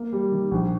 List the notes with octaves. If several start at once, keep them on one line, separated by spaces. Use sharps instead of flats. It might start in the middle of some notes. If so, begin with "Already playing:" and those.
Already playing: A#3
G3
D#3
A#1